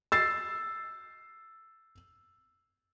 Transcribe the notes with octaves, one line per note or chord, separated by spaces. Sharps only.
E6 A6 C7